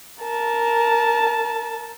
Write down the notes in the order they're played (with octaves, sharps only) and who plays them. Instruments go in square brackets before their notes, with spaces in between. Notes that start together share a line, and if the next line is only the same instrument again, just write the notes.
[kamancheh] A#4 A5